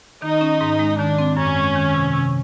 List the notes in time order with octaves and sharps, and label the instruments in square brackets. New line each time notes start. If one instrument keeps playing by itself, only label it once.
[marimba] D#3 [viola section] D#4
[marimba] C#4
G#2
G#3
[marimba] D#3 [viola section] D4
[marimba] C4
[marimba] F#2 [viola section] C#4
[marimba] G#3
D#3
C3
C3